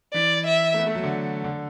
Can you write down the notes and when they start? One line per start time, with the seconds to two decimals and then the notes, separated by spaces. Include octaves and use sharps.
0.13 E3 D5
0.46 E5
0.74 A3
0.78 B3
0.87 A3
0.95 F#3
1.03 D3
1.44 D3